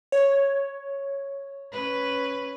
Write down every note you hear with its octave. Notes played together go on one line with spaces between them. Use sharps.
C#5
C#4 B4